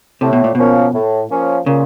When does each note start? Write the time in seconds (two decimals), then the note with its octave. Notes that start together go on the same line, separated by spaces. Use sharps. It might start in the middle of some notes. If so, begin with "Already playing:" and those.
0.21 A2 C3
0.33 B2
0.44 A#2
0.55 B2 F3 A#3 C#4
0.94 A2
1.30 F3 A#3 C#4
1.66 A#2 C#3